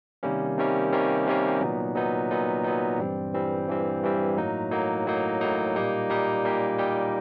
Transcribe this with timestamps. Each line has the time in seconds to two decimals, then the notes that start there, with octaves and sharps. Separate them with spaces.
0.23 C3 D#3 G3 A#3 C#4
0.57 C3 D#3 G3 A#3 C#4
0.93 C3 D#3 G3 A#3 C#4
1.26 C3 D#3 G3 A#3 C#4
1.61 A#2 F#3 B3 D#4
1.95 A#2 F#3 B3 D#4
2.31 A#2 F#3 B3 D#4
2.64 A#2 F#3 B3 D#4
2.99 G2 E3 G3 C4
3.34 G2 E3 G3 C4
3.68 G2 E3 G3 C4
4.03 G2 E3 G3 C4
4.37 A2 F#3 A#3 D#4
4.71 A2 F#3 A#3 D#4
5.07 A2 F#3 A#3 D#4
5.41 A2 F#3 A#3 D#4
5.76 A#2 G3 A#3 D#4 G4
6.09 A#2 G3 A#3 D#4 G4
6.45 A#2 G3 A#3 D#4 G4
6.78 A#2 G3 A#3 D#4 G4